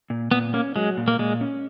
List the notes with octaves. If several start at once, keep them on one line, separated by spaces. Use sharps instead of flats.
A#2
A#2 B3
A#3 C#4
F#3 G#3
A#2
A#3
A#2 G#3
C#4